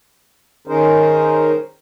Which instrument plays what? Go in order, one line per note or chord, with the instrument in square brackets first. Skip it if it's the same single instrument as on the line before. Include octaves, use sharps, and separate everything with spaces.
[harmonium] D#3 C#4 D#4 G#4 A#4 C5